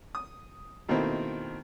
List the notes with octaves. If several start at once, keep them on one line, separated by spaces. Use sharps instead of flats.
D#6
B2 D#3 A3 A#3 C4 E4